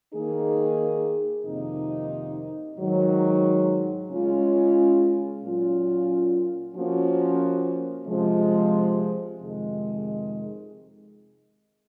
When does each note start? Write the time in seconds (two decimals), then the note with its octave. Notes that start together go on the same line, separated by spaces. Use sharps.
0.13 D#3 A#3 D#4 G#4
1.46 F2 C3 D#3 A#3 D#4
2.78 G#2 D#3 F#3
4.10 C#3 G#3 C#4 F4
5.42 A#2 F#3 C#4 F4
6.75 F3 A#3 C#4 F#4
8.08 C3 F3 G#3
9.41 F2 C3 D#3 G#3